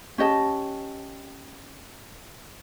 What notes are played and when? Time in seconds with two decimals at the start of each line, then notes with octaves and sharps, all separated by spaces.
0.18 C#4 G4 D#5 A5